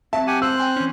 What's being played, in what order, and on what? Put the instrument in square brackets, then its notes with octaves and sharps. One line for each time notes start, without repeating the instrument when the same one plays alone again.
[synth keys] F#3 A5 [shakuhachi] C4 [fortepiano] E5
[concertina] G4 F#5 G#5
[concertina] C5 F#6 [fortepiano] E6
[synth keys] G5 G#5 C6
E3 C#4